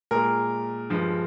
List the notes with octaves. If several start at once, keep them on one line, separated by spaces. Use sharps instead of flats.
A#2 G#3 A#4
G2 F3 G#3